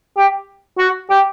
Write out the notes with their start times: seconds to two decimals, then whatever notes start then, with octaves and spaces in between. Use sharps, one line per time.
0.17 G4
0.79 F#4
1.10 G4